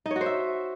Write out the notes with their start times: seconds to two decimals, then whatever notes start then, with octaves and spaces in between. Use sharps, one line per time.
0.06 D#4
0.11 C#5
0.16 F#4
0.21 C5
0.26 E5